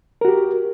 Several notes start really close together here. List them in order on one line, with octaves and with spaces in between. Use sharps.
A#4 F#4 G4